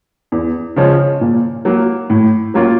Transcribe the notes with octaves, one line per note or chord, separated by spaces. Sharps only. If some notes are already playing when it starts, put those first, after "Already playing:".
E2
C#3 F3 G#3 C#4
A#2
F#3 A#3
A2
F#3 A#3 C#4 F4